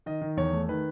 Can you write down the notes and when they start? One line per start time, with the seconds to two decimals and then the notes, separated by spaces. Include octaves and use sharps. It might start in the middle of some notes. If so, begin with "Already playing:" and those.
0.06 D#3 D#5
0.22 D#3
0.37 E2 C#5
0.53 A3
0.69 D#3 B4